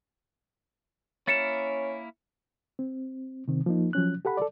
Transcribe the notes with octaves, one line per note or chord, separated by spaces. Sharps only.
A#3 C#4 E4 A#4 A6 C#7 E7
C4
C3 D#3 C4
F3 A#3 D#4
F3 F#3 C#4 F#6
G4 A4 F#5 B5
A4 D5